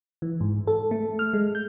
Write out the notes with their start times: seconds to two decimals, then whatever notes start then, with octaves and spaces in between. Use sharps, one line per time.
0.22 E3
0.41 G#2
0.67 A4
0.91 A3
1.19 F6
1.33 G#3
1.55 G6